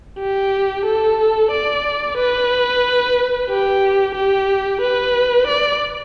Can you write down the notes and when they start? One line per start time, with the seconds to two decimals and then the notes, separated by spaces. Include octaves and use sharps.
0.19 G4
0.85 A4
1.51 D5
2.17 B4
3.49 G4
4.15 G4
4.81 B4
5.47 D5